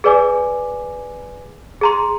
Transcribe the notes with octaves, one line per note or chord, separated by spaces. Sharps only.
G#4 B4 D5 G#5 D6
G#4 A#5 C6